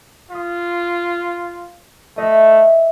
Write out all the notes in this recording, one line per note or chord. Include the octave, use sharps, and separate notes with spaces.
F4 D#6 B6
A3 D#5 E5